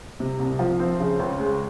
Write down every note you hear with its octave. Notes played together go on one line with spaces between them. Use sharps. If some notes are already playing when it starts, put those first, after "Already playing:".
C3
C2
F3
C4
C#3
C#2
G#3